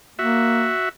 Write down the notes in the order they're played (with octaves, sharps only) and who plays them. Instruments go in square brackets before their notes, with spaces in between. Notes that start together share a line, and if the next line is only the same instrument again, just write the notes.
[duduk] A#3 [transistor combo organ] F#4 E5